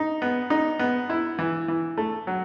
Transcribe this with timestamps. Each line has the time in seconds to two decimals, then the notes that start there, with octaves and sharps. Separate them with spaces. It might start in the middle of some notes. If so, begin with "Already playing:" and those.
Already playing: D#4
0.22 B3
0.50 D#4
0.79 B3
1.09 E4
1.39 E3
1.68 E3
1.97 A3
2.27 F#3